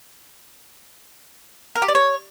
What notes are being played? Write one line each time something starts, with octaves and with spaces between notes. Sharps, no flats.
A#4
G4
D5
C#5